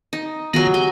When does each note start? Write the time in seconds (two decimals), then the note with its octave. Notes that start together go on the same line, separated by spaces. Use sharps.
0.13 D#4
0.54 D#3 F#3 B3 F4 G#4 A#5
0.74 G4 G#5